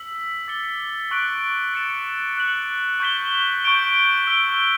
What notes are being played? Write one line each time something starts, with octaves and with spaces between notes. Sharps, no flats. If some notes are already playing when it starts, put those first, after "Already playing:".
Already playing: E6 B6 F#7
D6 A6 C#7 G7
C#6 F#6 B6 D7 F#7
A6 C#7 E7
F#6 C#7 F#7
C#6 G6 B6 E7 G7
C#6 G6 D7 G7
E6 B6 D7 G7